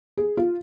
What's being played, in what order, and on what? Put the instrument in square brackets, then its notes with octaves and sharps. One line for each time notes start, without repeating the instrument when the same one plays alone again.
[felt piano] G#4
F4